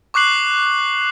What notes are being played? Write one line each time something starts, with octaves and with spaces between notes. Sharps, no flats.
C#6 D6 F#6 C7 F#7